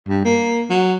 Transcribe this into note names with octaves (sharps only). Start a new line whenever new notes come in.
G2
A#3
F#3